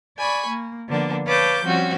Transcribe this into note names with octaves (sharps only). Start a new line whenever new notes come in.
D5 G#5 B5 C#6
A#3
D3 F3 A#3 B3 D4
B4 C#5 F5 A5 D6 G6
F3 G3 C4 C#4 F#4